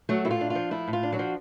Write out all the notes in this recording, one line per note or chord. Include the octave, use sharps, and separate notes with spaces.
F#3 A3 F#4
A2 E4
F4
D4
F4
F3
A3 E4
A2
F4
D4
F#3 F#4
F3